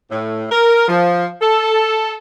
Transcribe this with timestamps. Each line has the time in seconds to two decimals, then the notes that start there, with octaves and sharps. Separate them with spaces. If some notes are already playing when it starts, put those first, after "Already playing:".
0.10 A2
0.51 A#4
0.88 F3
1.41 A4